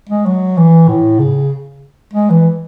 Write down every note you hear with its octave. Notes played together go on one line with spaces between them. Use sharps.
G#3
F#3
E3
A2
C#3
G#3
E3